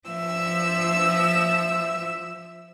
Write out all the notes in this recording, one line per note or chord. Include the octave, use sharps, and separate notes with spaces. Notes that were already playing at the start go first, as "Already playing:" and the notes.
F3 E5 E6